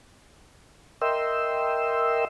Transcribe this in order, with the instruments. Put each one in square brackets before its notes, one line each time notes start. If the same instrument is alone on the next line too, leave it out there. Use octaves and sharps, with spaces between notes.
[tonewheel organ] A#4 D#5 E5 G5 C6 E6